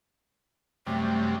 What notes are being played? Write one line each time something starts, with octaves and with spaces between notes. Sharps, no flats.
F#2 C3 G3 A3